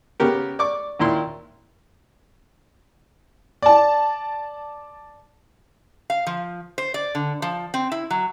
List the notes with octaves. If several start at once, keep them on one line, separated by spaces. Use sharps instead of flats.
C#3 B3 G4 A#4
D5 C#6 D6
D#2 A#2 E4 C6
D5 A5
F5
F3
C5
D5
D3
F3
C4
E4
F#3